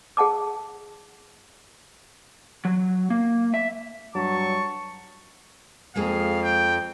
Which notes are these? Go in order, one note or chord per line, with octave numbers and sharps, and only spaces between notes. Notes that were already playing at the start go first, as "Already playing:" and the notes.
G#4 F#5 A5 D6
F#3
A#3
E5
G2 F#3 A5 C#6
F2 G#3 A#3 G#4 F5
G5